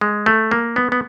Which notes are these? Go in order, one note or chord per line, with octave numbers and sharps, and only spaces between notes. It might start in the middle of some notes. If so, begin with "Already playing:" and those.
G#3
A3
A#3
B3
B3